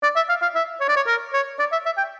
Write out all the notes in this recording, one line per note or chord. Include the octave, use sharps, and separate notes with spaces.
D5
E5
F5
F5
E5
C#5
D5
C#5
A#4
C#5
D5
E5
E5
G5